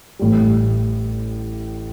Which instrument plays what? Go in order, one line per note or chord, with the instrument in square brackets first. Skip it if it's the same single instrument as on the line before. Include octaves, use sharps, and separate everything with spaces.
[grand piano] A1 A2 G3